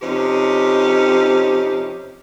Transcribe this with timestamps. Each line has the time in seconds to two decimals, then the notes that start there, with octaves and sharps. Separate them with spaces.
0.02 F2 C3 C#4 D#4 G4